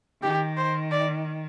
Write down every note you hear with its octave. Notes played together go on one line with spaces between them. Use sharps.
D#3 G4
C5
D5